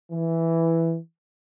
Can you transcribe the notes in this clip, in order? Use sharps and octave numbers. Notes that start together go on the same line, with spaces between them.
E3